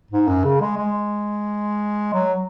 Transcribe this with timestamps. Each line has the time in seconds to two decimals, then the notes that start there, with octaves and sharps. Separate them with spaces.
0.11 G#2
0.27 F#2
0.44 C#3
0.61 G#3
0.77 G#3
2.13 F#3